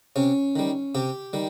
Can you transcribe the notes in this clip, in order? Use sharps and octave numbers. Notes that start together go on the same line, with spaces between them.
C3 C#4
D#3 G3
C3 G4
D#3 G3